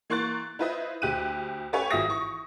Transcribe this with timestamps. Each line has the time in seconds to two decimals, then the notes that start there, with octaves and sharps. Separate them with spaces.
0.10 E3 A#3 C6 C#6 F#6 A6
0.59 E4 F4 B4 C5 D#5
1.02 D2 G4 F#6 D#7
1.73 C#4 G4 A4 B4 C#5 G#5
1.91 G#1 F4 F#4 E5 D#6 A#6
2.08 E3 C#6